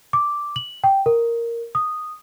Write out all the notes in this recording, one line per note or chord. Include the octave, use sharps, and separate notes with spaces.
D6
F#7
G5
A#4
D#6